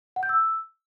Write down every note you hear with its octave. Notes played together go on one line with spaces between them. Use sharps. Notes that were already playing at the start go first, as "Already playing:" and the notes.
F#5
G6
E6